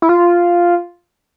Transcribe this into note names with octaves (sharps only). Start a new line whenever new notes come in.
E4
F4